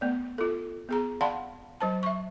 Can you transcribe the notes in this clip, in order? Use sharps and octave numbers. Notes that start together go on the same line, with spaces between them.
A3 B3 D5
F4 A4
B3 G#4 A#5
D5 F5 F#5 A5 B5 C6
F#3 C5 A5
E5 C#6